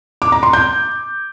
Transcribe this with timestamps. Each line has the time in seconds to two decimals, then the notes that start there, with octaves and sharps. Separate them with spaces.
0.22 D6
0.32 A#5
0.43 C6
0.53 G6